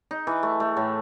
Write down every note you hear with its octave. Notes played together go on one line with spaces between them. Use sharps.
D#4
E3
A3
A3
A2